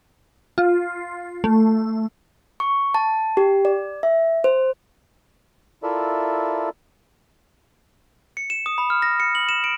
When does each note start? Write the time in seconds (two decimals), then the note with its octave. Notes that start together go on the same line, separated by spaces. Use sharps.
0.58 F4
1.44 A3
2.60 C#6
2.95 A5
3.37 G4
3.65 D5
4.03 E5
4.44 C5
5.83 E4 F4 A4 A#4 D5 E5
8.37 C#7
8.50 E7
8.66 D#6
8.78 B5
8.90 F6
9.02 A#6
9.20 C#7
9.35 F#7
9.49 E7
9.64 D7